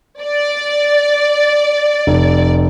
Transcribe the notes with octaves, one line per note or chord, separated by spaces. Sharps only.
D5
F1